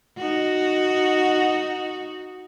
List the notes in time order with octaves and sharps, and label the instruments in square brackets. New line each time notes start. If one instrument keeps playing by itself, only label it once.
[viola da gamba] D#4 F#4